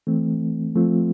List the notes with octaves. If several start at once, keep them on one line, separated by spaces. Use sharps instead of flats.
E3 A3 C4
F3 A3 C4 F4